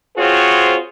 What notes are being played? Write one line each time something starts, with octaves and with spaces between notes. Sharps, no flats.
C4 F4 F#4 G#4 C5 C#5